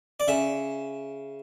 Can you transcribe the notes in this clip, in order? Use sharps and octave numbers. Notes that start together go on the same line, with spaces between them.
D5
C#3 E5